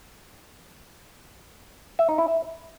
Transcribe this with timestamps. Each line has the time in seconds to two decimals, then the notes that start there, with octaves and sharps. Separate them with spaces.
1.99 E5
2.09 D#4
2.18 E4
2.28 E5